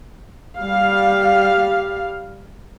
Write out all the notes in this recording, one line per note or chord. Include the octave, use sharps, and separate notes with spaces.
G3 F5